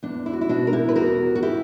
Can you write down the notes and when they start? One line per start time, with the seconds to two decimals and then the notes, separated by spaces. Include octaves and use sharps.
0.03 E2 D4
0.26 E4
0.33 F#4
0.41 E4
0.49 B2 D4 F#4
0.67 A#4
0.73 E4 G4
0.89 B4
0.95 E2 F#4 A#4
1.35 F#4
1.43 E4 G4